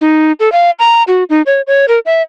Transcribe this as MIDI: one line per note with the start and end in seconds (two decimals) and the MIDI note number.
0.01 0.32 63
0.40 0.52 69
0.52 0.71 77
0.79 1.03 82
1.08 1.24 66
1.30 1.42 63
1.46 1.62 73
1.67 1.86 73
1.88 1.99 70
2.06 2.22 76